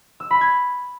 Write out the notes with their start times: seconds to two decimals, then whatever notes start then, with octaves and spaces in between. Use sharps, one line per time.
0.20 E6
0.31 B5
0.41 G#6